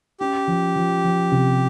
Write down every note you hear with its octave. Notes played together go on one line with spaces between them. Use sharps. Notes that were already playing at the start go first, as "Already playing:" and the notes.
C#4 G4
F3
F3
F3
C3